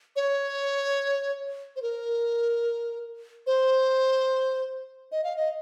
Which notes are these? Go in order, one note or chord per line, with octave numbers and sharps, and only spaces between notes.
C#5
C5
A#4
C5
D#5
F5
D#5